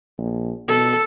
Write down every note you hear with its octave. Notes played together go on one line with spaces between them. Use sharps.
A#1
B2 A4